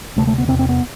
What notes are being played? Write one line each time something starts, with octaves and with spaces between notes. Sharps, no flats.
D2 C3 A3
A3
B3
E2 C3 C4
C4
B3